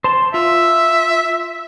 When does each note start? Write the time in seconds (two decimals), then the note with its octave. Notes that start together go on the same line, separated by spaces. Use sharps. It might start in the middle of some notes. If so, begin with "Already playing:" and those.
0.04 C5 A5 C6
0.34 F4 E5